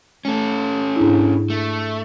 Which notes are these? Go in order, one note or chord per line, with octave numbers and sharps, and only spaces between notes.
A3 C#4 A4
G#2 D4 E4
A3